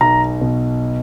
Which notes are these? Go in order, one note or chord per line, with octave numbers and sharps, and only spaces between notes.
B1 A#5
B2